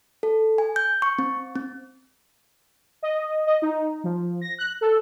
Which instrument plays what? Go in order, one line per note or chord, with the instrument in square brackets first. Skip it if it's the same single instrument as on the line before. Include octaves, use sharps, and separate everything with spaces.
[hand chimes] A4
G#5
G6
C#6
C4
C4
[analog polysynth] D#5
D#5
D#4
F3
A#6
F#6
A4